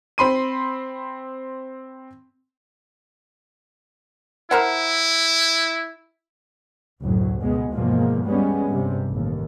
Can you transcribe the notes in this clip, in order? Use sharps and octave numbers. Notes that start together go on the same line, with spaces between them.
C4 B5 C6 D#7
E4 A#4 C5 F#5
F#1 D2 A2 F#3
C#2 B2 G#3 B3
E2 G2 B2 F3 G#3 A#3
G3 G#3 B3 C#4
G2 C3 G3
A1 D#2